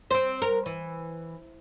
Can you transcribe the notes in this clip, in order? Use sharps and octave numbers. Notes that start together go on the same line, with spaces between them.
C4 C5
A#4
E3